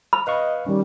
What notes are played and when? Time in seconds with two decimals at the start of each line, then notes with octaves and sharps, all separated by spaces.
0.13 B5
0.27 B4 D#5 F5 C#6
0.66 D#3 G3 C#4